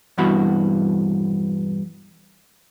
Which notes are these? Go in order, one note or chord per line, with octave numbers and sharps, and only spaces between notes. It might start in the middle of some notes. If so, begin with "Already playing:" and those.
E2 G2 B2 E3 F#4 B5